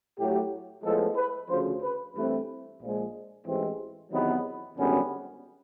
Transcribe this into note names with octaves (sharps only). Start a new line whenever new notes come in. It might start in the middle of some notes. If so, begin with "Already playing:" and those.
A2 F#3 A3 G4
A2 F3 G#3 B3 A4
B4
D2 C#3 F3 C5
B4
G2 E3 A3 C4 B4
A#1 A#2 F3 G#3
A1 G#2 E3 G#3 C4
E2 C3 D#3 F#3 B3 E4
G#1 F#2 D3 G3 B3 C#4